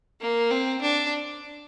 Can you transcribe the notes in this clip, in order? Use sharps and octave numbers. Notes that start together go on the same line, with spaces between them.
A#3
C4
D4